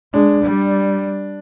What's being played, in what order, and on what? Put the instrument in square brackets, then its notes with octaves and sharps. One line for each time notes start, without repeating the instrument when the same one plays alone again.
[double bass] G#3 [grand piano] D4
[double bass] G3